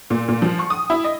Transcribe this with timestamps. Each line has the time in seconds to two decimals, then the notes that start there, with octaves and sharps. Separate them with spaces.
0.10 A#2
0.28 A#2
0.42 F3
0.59 C#6
0.70 D#6
0.90 E4
1.04 D#5